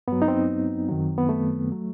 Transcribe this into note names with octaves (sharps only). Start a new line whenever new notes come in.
G2 F#3 B3
D#4
C4
F#2 D#3 F#3
B3
A3
F#3